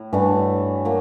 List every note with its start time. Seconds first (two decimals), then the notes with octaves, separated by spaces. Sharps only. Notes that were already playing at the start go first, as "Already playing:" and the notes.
Already playing: A2
0.13 G2 E3 A3 D4 F#4
0.85 F#3 A#3